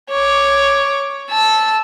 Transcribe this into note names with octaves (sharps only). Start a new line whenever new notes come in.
C#5 D6
A5 E6